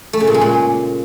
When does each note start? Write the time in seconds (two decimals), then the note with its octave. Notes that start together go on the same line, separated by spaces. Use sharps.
0.13 A3
0.20 C#3
0.27 A#2
0.34 G#3
0.41 A#2